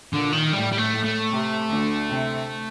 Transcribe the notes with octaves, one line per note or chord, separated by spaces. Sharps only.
A#2 D3
D#3
A2 G3
G3
A3
A2
A3
C3
D2 D3
C3 C4